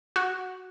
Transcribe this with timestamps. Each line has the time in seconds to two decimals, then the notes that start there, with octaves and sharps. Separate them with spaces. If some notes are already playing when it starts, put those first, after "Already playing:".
0.16 F#4